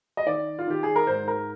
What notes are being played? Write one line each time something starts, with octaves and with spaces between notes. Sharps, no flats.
D#5
D#3 D5
F4
D#3 G4
G#4
A#4
G#2 C5
A#4